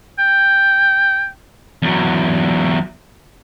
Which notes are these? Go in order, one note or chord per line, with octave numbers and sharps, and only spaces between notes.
G5
E2 F#3